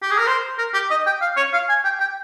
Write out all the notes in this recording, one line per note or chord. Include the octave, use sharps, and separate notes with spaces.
G4
G#4
A#4
C5
A#4
G4
D#5
G5
F5
C#5
F5
G#5
G5
G5